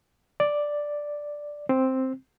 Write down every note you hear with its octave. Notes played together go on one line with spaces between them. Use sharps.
D5
C4